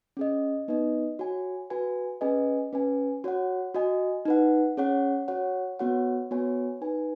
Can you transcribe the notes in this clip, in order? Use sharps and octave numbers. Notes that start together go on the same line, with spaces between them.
C#4 G#4 D#5
B3 D#4 B4 D#5
F#4 C#5 G#5
F#4 B4 G#5
C#4 G#4 B4 D#5 G#5
C#4 B4 G#5
F#4 C#5 F#5
F#4 D#5 G#5
D#4 B4 F#5
C#4 G#4 C#5 F#5
F#4 C#5 F#5
B3 F#4 C#5 F#5
B3 F#4 C#5 G#5
D#4 B4 G#5